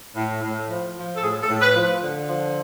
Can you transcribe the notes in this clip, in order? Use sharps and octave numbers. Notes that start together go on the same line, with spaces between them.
A2
A2
F3
F3
A4
A2 G#4
A4
A2
B4
F3
D3
F3